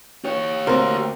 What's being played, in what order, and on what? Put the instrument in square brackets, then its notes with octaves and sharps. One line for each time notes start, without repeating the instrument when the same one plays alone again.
[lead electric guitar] G4 C#5
[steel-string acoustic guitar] D2 C4 [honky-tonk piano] A#4 [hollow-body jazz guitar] C5